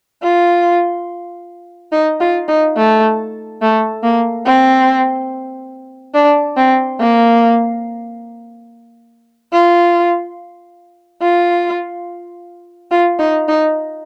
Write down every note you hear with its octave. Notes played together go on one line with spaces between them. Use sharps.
F4
D#4
F4
D#4
A3
A3
A#3
C4
D4
C4
A#3
F4
F4
F4
D#4
D#4